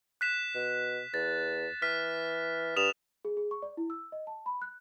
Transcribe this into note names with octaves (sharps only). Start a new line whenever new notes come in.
F#6 B6 E7
B2
E2 A6
E3 F6 B6
G2 D#6 E7 F7
G#4
G#4
C#6
D5
E4
E6
D#5
A5
B5
F#6